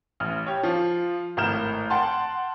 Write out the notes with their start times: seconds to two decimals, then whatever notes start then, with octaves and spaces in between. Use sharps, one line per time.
0.20 A1 F6
0.47 G4 C#5
0.63 F3 F4
1.37 G#1 A2 A#4 F6 G6 E7
1.90 F#5 G5 A5 C6